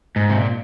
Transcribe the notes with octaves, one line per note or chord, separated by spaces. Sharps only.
G#2
C3
A#2